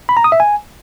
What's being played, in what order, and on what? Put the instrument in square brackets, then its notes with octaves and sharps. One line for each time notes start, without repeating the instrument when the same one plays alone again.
[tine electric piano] B5
A#5
D#6
E5
G#5